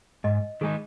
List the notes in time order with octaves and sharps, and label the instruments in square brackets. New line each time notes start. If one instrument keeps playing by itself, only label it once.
[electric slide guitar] G#2 [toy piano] D#5
[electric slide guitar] D#3 G#3 D#4 [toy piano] G#4